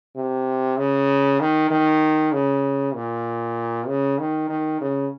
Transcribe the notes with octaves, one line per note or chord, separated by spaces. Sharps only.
C3
C#3
D#3
D#3
C#3
A#2
C#3
D#3
D#3
C#3